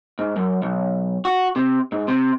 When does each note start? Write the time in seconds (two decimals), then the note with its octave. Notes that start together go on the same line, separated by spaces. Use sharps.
0.19 G#2
0.36 F#2
0.62 B1
1.25 F#4
1.56 C3
1.92 G#2
2.08 C3